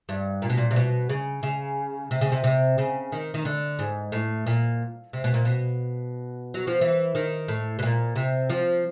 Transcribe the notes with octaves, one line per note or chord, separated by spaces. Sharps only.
G2
A#2
B2
A#2
C3
B2
C#3
C#3
C3
C#3
C3
C3
C#3
D#3
D#3
D3
G#2
A2
A#2
C3
B2
A#2
B2
F#3
F3
E3
D#3
A2
B2
A#2
C3
F3